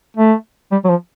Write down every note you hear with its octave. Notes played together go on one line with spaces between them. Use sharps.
A3
G3
F#3
F3